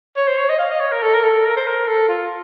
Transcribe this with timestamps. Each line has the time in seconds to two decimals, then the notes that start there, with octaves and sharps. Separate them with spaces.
0.16 C#5
0.28 C5
0.38 C#5
0.49 D#5
0.59 F5
0.70 D#5
0.80 C#5
0.92 A#4
1.03 A4
1.14 A#4
1.24 A4
1.45 A#4
1.57 C5
1.67 A#4
1.88 A4
2.09 F4